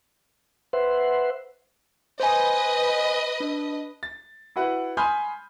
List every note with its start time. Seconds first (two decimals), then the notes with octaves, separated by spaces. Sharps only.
0.73 B4 C5 E5 F#5 C6
2.20 B4 C5 D#5 G#5
3.40 D4
4.03 A6
4.56 E4 F#4 B4 F#5
4.97 G#5 B5 C6 D#6 F6 G6